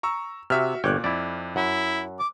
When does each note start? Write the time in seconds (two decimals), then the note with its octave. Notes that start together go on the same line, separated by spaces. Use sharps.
0.03 A#5 C#6 E6
0.50 C3 F#4 E5 F6
0.84 G1 A#2 C#5 G5 D6 F#6
1.04 F2 E4 D5
1.56 F#2 E4 F#5
2.19 D6